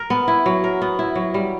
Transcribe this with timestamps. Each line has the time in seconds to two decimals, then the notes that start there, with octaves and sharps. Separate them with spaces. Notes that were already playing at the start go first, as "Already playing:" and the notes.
Already playing: A#4
0.10 B3
0.28 E4
0.46 F#3
0.64 A#4
0.82 B3
0.99 E4
1.16 F#3
1.34 G3